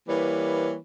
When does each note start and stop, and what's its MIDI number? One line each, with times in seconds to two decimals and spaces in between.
0.09 0.76 52
0.09 0.76 55
0.09 0.76 58
0.09 0.76 71
0.09 0.76 73